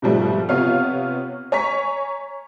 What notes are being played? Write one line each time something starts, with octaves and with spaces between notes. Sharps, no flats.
G#2 B2 F3 G3 A3
C3 B3 F4 C#5 F5 F6
C#5 G#5 A#5 C#6 B6